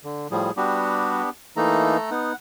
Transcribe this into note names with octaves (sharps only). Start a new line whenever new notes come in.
D3
A2 F3 G3 G#4
G3 B3 D4 F#4 G4
E3 A3 A#3 D#4 A4 A#5
B3 D#4 F#5